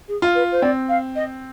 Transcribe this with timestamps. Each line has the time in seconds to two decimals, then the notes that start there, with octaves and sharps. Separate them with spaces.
0.08 G#4
0.22 F4
0.35 B4
0.51 C5
0.62 C4 D5
0.89 F5
1.15 D#5